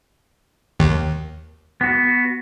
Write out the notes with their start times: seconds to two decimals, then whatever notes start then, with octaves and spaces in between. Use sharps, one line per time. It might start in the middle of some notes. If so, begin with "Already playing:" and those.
0.80 D#2
1.81 B3 F#4